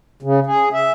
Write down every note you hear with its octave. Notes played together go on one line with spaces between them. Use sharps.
C#3
G#4
E5